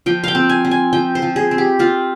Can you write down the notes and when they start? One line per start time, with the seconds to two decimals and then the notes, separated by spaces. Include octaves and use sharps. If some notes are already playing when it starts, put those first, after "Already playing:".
0.06 F3 G5
0.24 F5 G5
0.35 C4
0.49 G#5
0.65 C4
0.71 G#5
0.93 F3 G5
1.15 C5
1.22 F3
1.36 G#4
1.51 C4
1.58 G4
1.79 C4 F4